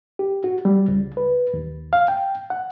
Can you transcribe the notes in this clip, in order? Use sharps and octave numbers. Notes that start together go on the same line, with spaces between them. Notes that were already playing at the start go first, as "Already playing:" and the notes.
G4
F#4
G3
C#2
B4
D#2
F5
G5
F#5